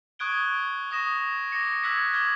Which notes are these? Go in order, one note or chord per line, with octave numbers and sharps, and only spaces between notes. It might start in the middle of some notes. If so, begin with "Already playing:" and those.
C#6 D#6 F#6 G#6 D7 G7
C#6 D#6 A#6 E7
D6 A#6 C#7 E7
D6 E6 F#6 G#6 B6 C#7
D6 F6 G#6